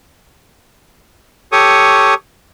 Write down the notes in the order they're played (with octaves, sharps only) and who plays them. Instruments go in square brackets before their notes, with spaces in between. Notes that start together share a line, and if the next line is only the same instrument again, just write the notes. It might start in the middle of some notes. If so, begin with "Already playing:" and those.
[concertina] G4 A4 C#5 C#6 D#6